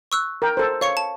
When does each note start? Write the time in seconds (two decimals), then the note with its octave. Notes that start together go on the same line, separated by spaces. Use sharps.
0.12 C#6 E6 F#6
0.42 A#4 G5
0.57 A4 C5
0.81 C#5 F5 C#6 C#7
0.97 A5